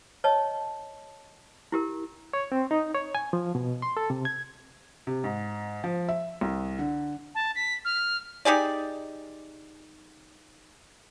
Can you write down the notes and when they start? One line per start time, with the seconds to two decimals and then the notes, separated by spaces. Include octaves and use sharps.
0.24 C#5 D#5 A5
1.72 E4 G4 A#4
2.33 C#5
2.52 C4
2.71 D#4
2.94 C#5
3.15 G#5
3.33 F3
3.55 B2
3.82 C6
3.97 A4
4.10 C3
4.25 G#6
5.07 C3
5.24 G#2
5.84 F3
6.09 E5
6.41 C2
6.79 D3
7.35 A5
7.56 B6
7.85 F6
8.45 D#4 G4 G#4 D5